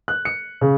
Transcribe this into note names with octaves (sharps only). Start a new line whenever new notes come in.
F#6
C#7
C#3